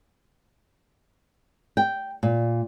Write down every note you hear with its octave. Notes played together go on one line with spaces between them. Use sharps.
G5
A#2